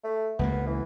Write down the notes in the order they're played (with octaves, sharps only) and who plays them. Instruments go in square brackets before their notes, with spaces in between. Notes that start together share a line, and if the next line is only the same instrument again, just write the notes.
[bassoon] A3
[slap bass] C#2 G#3 A#3 [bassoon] B3
[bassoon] E3